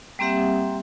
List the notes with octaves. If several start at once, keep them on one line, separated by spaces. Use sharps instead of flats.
G3 A#3 C4 G4 E5 F#5